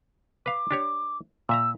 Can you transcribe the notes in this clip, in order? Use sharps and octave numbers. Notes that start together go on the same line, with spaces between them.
B4 F5 D6
D4 G4 C#5
A#2 E5 A#5 E6